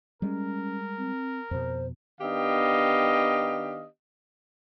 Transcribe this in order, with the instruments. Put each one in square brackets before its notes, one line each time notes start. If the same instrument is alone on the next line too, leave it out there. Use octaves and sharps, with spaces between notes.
[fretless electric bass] G3 G#3 [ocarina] C#4 [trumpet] A#4
[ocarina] C4
[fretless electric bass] F2 B2 [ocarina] C5
[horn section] D#3 B3 D4 G4 D#5 F5